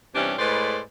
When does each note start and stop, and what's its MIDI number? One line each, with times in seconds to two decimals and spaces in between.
0.15 0.33 48
0.15 0.33 52
0.15 0.33 55
0.15 0.33 61
0.15 0.33 62
0.38 0.79 45
0.38 0.79 56
0.38 0.79 71
0.38 0.79 72
0.38 0.79 74